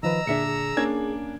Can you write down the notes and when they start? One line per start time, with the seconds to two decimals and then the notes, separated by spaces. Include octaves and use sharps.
0.03 D#3 F3 B4 D#5 A#5 E6
0.27 A#2 D3 D4 G#4 E5 C#7
0.46 G#4
0.77 A#3 C#4 D4 G#5 G#6